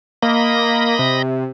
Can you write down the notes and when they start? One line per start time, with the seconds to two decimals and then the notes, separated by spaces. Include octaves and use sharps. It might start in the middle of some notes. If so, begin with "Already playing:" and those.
0.22 A#3 D#5 B5 A#6
0.99 C3